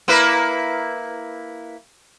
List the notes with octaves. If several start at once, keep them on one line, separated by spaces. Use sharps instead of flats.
A#3 E4 B4